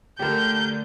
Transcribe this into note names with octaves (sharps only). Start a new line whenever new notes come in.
D3 A3 G4 A#4 G6